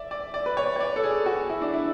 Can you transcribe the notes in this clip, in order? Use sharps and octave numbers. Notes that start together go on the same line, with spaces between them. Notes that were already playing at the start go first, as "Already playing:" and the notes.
Already playing: D5 E5
D5
D5
B4
C#5
C#5
D5
A4
G#4
F#4
E4
D4
E4